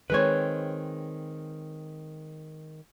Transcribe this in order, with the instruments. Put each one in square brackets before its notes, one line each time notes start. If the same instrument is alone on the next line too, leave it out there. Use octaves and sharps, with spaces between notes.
[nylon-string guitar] D#3 G#3 C4 [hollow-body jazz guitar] B4 C#5